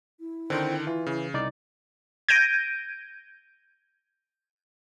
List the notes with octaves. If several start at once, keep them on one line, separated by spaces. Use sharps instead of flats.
E4
D3 D#3 C4 G5
E3 F4
C#3
C2 D#4 D5
G6 G#6 A#6 D7 D#7